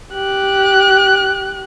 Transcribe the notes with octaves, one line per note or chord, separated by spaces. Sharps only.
G4 F#6